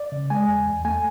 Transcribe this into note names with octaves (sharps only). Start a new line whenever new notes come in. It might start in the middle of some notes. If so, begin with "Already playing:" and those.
Already playing: D5
C#3
G#3 G#5
E2
E2
A3 G#5